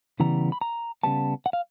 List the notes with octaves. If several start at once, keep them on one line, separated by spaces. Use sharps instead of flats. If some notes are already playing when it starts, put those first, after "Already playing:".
C#3 E3 G3 B3 A#5
B5
A#5
C#3 E3 G3 B3 A5
F#5
F5